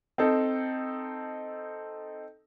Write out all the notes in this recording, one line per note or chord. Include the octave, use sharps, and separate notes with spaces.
C4 D#4 A4